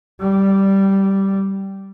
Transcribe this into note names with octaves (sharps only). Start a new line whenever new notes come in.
G3